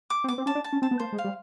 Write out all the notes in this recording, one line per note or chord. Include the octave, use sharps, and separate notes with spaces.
D6
C4
B3 D6
C4
C#4 A5
D4
A5
C#4
C4 A5
B3
A#3 C5
G#3
F5
G3